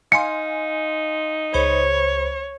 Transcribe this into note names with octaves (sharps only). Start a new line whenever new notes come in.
D#4 F5 G#5 C6 C#7
C#2 C5 C#5 B5